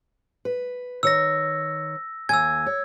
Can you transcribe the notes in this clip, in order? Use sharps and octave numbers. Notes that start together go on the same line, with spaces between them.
B4
D#3 C#5 E6 A#6
D#2 G#5 E6 G#6
C#5